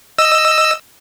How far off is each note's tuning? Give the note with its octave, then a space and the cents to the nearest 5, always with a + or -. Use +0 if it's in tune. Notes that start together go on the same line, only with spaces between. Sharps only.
D#5 +0 E6 +5